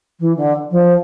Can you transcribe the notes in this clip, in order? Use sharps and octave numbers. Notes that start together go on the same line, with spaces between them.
E3
D3
F3